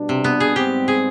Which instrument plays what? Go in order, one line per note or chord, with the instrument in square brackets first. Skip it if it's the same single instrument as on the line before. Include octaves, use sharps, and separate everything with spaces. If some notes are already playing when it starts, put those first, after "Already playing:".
Already playing: [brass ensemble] B2 G3 D4
[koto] C3
B3
G#4
[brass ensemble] G#2 G3 C4 [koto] G4
[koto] G#4